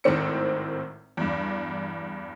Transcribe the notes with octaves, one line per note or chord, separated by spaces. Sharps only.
G#1 A2 D#3 C4 C#7
E2 G2